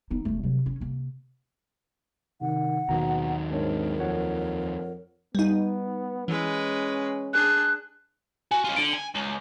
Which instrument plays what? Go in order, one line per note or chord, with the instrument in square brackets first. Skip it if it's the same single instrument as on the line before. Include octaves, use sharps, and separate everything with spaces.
[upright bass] B3 D#4
E1 A3
C3 F#3
C#4
C3 A#3
[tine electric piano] C3 [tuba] D#3 [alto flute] F#5
[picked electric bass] D#2 D#3 F#3 [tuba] B2 [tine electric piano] A#5
[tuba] G#2 [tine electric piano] C4 D4 C#5 [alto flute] A#4
[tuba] F2 [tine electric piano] F4 C#5 F#5
[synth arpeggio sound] G3 D#4 [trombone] B3
[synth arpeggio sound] E3 [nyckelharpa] G#3 B4 [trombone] C#4
[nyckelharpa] D4 G#4 [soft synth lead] F#6
[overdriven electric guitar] F#4 [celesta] G#5
[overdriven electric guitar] C#4 F4
[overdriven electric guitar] D3 [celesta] D7
[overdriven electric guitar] G#5
C#2